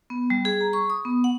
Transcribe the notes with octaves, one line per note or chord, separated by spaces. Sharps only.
B3
G3
G#4
A#5
C#6
D#6
B3
F#5